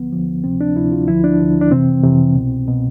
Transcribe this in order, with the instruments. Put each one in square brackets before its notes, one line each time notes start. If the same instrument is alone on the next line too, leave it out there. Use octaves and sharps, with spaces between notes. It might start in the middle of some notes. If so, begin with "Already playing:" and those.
Already playing: [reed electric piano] D2 D3 F3 B3
D2 D3 F3
D2 C3 F3 C4
D4
D2 C3 F3 E4
F4
D2 D3 F3 E4
D4
D2 D3 F3
D4
F2 C3 E3 C4
F2 C3 E3
C2 B2
B2